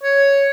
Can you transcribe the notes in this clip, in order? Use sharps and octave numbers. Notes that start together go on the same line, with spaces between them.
C#5